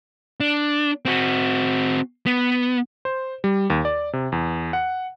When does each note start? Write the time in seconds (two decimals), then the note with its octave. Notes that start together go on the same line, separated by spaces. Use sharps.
0.40 D4
1.05 C4 F#4
2.26 B3
3.05 C5
3.44 G3
3.70 D#2
3.85 D5
4.13 C3
4.32 E2
4.73 F#5